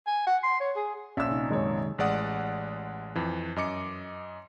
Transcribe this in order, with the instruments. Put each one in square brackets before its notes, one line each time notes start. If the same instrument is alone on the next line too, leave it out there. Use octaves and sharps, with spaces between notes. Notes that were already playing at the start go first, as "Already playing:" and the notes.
[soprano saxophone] G#5
F#5
C6
C#5
G#4
[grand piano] A#1 [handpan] C#4 [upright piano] E5 E6
[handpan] C3 D#4
[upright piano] F#2 C#5 [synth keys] D#3 G#3
[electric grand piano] A1 G#3 D5 F#5 D#6
F2 E3
F#2 D#5 D6 C#7